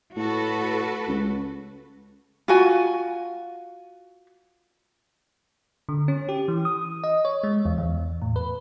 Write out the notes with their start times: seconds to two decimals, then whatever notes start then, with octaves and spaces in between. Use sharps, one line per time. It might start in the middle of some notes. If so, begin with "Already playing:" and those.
0.16 A2 F#4 A4 B4
1.08 C#2
2.48 F4 F#4 G#5
5.89 D3
6.08 C#4
6.29 G4
6.48 E3
6.65 D#6
7.04 D#5
7.25 C#5
7.43 G#3
7.65 E2
7.78 E2
8.22 A2
8.36 B4